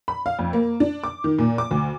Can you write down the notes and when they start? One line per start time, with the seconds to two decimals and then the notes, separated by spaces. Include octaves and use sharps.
0.08 B5
0.26 F5
0.39 F2
0.53 A#3
0.80 D4
1.04 D6
1.24 D#3
1.39 A#2
1.58 D6
1.71 D2